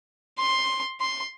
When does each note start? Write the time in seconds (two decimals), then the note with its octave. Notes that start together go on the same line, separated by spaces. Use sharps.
0.39 C6
1.01 C6